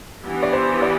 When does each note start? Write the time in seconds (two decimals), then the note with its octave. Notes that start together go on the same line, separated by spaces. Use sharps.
0.24 E3 B3 D4 G4
0.43 D5
0.53 C5
0.82 D5